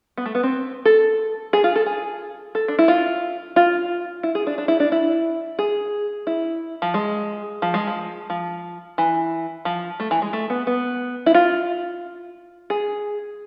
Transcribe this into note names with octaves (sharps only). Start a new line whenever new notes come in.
B3
A3
B3
C4
A4
G#4
F4
A4
G#4
A4
D4
E4
F4
F4
E4
G#4
D4
D4
E4
D4
E4
G#4
E4
F3
G#3
F3
G#3
F3
F3
E3
F3
A3
E3
G#3
A3
B3
B3
E4
F4
G#4